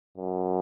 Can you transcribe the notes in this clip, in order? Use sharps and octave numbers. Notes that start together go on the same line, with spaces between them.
F#2